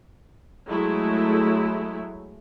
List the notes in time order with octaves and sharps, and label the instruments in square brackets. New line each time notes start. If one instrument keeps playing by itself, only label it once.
[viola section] F#3 G#3 A3 E4